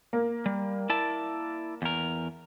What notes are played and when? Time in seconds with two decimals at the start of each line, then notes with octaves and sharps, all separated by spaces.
0.13 A#3
0.46 G3
0.90 E4 D5 A5
1.82 E2 A#4